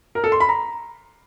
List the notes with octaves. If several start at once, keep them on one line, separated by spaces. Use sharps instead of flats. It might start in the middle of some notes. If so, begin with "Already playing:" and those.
A#4
A4
C6
B5
A#5